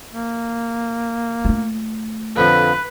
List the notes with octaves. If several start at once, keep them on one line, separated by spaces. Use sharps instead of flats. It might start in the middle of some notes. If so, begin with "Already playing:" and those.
A#3
A3 F4
F2 D3 F3 B4